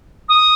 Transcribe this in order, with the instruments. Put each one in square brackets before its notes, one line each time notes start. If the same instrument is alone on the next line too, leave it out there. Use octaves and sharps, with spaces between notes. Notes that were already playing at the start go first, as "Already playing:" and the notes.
[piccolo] D#6